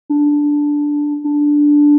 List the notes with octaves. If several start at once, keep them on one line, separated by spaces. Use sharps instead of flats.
D4
D4